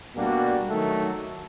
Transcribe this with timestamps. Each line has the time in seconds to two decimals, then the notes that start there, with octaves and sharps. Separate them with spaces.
0.16 B2 G3 A#3 D4 F#4
0.69 D#3 F#3 A3